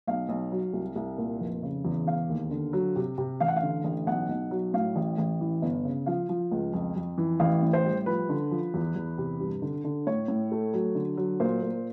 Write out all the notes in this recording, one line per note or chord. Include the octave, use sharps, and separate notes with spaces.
B1 F5
B1
F#3
C2
C2
A#2
F1
C#3
E2
E1 F5
D#2
D3
F#3
C3
C3
A1 F5
F#5
F5
D3
A1
B1 F#5
B1
F#3
A2 F5
A1
A1
E3
G1
C#3
F3 F5
F3
C#2
F2
F2
E3
A1 F5
A2
C5
G3
F3 B4
D3
F3
E2
E2
C3
G2
D3
D3
A2 C#5
A2
A3
F#3
D3
F#3
A#2 C5
A#2